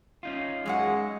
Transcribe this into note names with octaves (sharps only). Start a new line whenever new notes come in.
C#4 D#4 F4
F#2 F#3 G#3 F#5